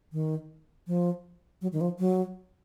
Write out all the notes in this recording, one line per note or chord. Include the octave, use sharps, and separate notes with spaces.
D#3
F3
F#3
D#3
F3
F#3